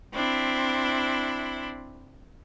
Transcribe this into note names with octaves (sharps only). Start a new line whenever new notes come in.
C4 D4 E4 B5